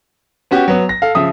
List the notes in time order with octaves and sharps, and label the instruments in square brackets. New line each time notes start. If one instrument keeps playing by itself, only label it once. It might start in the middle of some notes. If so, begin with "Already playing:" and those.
[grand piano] B3 C#4 F#4 G4
F#3 B3
A#6
A4 F5
C#3 F3 E5 D#6